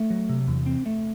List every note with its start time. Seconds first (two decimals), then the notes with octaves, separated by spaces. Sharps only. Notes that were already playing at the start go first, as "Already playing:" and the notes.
Already playing: A3
0.10 F#3
0.29 C3
0.48 E2
0.66 C4
0.86 A3